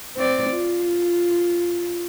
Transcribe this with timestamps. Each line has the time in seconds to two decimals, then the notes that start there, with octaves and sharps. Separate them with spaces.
0.17 C4 D5
0.51 F4